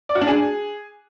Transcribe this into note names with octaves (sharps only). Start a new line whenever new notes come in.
D5
F#4
D4
G#4